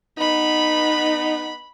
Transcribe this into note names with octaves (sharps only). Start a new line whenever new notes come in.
B3 D#4 B5